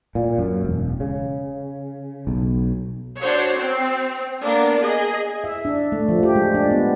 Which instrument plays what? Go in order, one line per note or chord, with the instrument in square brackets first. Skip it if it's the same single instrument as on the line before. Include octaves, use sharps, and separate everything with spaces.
[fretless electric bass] A#2
F#2
E1
C#3
B1
[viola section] D4 F#4 C5 C#5
C4
A#3 B3 D4
G#4 D#5
[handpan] E5
D4
A3
F3
G4
G#3
D4
B3